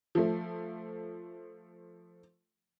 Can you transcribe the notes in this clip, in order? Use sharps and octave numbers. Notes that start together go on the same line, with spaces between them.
F3 A3